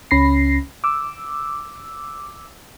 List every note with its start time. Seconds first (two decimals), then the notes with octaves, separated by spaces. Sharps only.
0.11 C#2 C#4 B5 A#6 C7
0.84 D6 E6